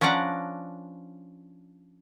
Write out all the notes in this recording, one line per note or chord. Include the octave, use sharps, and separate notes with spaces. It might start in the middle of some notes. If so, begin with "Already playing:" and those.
F3 C#4 D4 D5 F#5 A#5